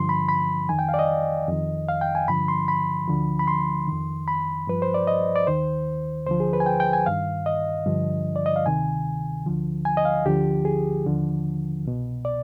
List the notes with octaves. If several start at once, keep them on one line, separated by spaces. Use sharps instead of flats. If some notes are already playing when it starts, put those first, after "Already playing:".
Already playing: G2 D3 F3 C6
B5
B5
F2 D#3 G#5
G5
F5
D5
D#5
F2 D#3
F5
G5
G#5
G2 D3 F3 B5
C6
B5
D2 D3 F3
B5
C6
F2 D#3
B5
G2 F3 B4
C5
D5
D#5
D5
D#2 D#3 C5
D2 D3 F3 C5
G#4
B4
G#5
G5
G5
G#5
G2 D#3 F5
D#5
G2 D3 F3
D5
D#5
F5
D2 C3 D#3 G#5
D2 D3 F3
G#5
D#5
F5
D2 D3 F3 G4
G#4
D#2 D3 F3
C2 B2
D5